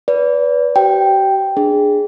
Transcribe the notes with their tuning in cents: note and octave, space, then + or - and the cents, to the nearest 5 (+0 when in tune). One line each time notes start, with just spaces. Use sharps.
B4 -5 D5 -35
G4 -45 C5 -10 G5 +0
D4 +10 G#4 +0